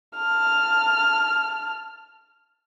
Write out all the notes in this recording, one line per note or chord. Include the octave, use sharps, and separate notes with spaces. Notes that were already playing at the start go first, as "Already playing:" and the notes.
A5 F6